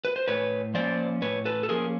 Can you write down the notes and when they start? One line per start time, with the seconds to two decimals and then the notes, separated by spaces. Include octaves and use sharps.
0.05 B4
0.16 C5
0.28 A2 B4 C#5
0.74 F3 A#3 C#4 C5 D5
1.22 A2 B4 C#5
1.45 A4 B4
1.63 A4
1.69 F3 A#3 C#4 G#4 A#4